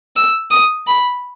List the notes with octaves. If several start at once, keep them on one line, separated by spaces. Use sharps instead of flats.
E6
D#6
B5